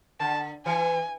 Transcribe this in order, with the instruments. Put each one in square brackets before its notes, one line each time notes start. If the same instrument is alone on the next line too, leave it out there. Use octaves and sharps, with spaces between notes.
[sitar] D3 [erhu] A5
[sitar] E3 [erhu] G#5